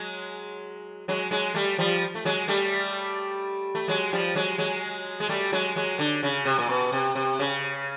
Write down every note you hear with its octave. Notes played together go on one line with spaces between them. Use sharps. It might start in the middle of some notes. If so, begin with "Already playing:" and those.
Already playing: F#3 G#3
F#3 G#3
F#3 G#3
G3 A3
F3 G3
A3
F#3 G#3
G3 A3
A3
F#3 G#3
F3 G3
F#3 G#3
F#3 G#3
G#3
G3 A3
F#3 G#3
F#3 G#3
D3
C#3
C3
A#2
B2
C3
C3
C#3